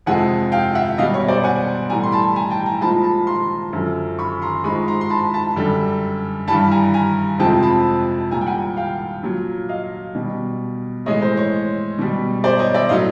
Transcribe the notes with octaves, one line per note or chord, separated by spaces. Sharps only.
F2 C3 F3 G#3 F#5 G#5
F5 G5
E5 F#5
B2 G3 D#5 F5
C#5
C5 D5
F#5 G#5
A2 E3 G3 G#5 A#5
C6
A5 B5
G#5 A#5
G5 A5
G#5 A#5
A#2 F3 G#3 A5 B5
A5 B5
A#5 C6
F#2 D3 F3
B5 C#6
A#5 C6
G#2 F3 G#3 B5 C#6
A#5 C6
C6
A5 B5
A5 B5
F#2 D3 G3
G2 E3 G3 A5 B5
G#5 A#5
G#5 A#5
F2 C3 F3 G#3 G5 A5
A5 B5
A#2 G3 G#5 A#5
G5
F#5 G#5
F5 G5
A#2 F#3
D#5 F5
B2 G3
A2 E3 G#3 C#5 D#5
C5
C#5
B2 G3
C5 D5
C#5 D#5
D5 E5
A2 F#3 D#5 F5